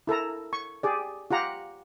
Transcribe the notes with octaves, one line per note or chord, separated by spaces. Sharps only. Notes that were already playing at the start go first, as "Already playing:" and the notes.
E4 A4 A#4 A#5
C#6
G4 G#4 D5
F4 G4 F#5 A#5